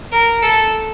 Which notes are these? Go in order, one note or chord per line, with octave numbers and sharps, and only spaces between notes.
A#4
A4